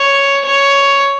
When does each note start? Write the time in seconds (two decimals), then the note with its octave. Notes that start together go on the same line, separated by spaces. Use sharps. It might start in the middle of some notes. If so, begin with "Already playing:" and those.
Already playing: C#5
0.45 C#5